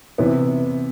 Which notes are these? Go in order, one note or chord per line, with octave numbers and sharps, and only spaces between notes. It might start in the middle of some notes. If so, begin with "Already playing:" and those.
C3 E3 B3 E4